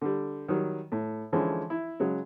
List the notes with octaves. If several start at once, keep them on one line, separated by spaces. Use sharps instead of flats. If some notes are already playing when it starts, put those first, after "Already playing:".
D3 G3
D#3 F#3 G3
A2
D3 E3 F3 G#3 C#4
E4
C#3 F#3 G#3